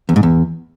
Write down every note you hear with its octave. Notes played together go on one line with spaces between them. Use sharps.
E2
G#2
E2